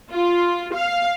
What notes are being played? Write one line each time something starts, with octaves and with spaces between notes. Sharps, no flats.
F4
F5